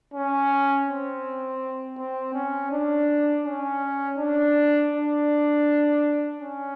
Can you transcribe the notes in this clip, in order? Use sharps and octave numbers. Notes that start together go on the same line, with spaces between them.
C#4
C4
C4
C#4
D4
C#4
D4
D4
C#4